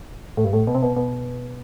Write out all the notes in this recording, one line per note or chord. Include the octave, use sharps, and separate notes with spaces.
A2
G2
A2
B2
C3
B2
B2